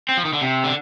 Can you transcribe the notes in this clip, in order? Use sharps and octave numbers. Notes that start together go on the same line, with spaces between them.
C4
F3
D#3
D3
C3
D3